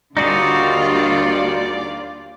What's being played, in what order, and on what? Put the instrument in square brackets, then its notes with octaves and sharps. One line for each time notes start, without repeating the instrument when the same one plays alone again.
[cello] D#2 F4 [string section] D3 G3 [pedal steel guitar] D#4 F#4 G#4 [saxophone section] D5